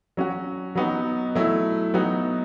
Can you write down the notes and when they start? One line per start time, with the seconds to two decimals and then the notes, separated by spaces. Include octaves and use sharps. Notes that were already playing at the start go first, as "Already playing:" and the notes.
0.17 F#3 C#4 F#4
0.75 F#3 B3 D#4 F#4
1.35 F#3 A3 E4
1.94 F#3 B3 D#4 F#4